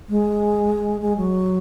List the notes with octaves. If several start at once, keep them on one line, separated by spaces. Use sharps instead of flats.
G#3
G#3
F#3